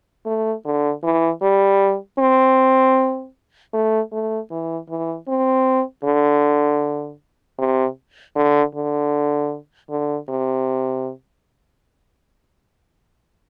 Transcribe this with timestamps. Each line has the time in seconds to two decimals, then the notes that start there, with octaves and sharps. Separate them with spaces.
0.26 A3
0.65 D3
1.03 E3
1.42 G3
2.19 C4
3.73 A3
4.12 A3
4.51 E3
4.89 E3
5.28 C4
6.04 D3
7.59 C3
8.35 D3
8.75 D3
9.90 D3
10.29 C3